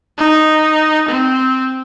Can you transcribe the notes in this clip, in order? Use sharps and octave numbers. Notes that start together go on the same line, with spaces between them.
D#4
C4